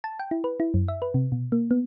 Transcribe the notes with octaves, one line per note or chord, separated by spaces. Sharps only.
A5
G5
E4
B4
E4
F#2
E5
B4
C3
B2
A#3
B3